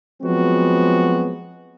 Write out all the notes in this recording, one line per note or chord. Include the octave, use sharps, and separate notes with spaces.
F3 F#3 G#3 B3 C4 F#4